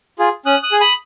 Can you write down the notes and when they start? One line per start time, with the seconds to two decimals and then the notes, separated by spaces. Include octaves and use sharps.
0.19 F4 G#4
0.45 C#4 D#6 F#6
0.63 D#6 F#6
0.72 G#4
0.80 B5 D#6